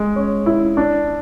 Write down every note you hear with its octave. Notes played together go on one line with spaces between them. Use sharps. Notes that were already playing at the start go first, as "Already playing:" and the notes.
Already playing: G#3
C#4
E4
D4